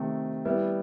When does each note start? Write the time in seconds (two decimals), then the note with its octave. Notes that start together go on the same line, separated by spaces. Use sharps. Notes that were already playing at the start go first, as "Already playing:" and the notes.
Already playing: C3 D#3 A3 C4
0.45 G3 B3 E4